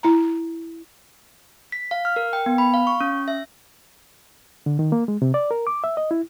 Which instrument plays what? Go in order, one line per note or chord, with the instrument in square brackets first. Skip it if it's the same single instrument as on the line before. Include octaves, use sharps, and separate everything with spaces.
[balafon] E4 A#5
[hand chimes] B6
F5
F6
A#4
G5
B3
B5
F5
C#6
C#4
E5
[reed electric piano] D3
D#3
A#3
G#3
C3
D5
A#4
D6
E5
D#5
E4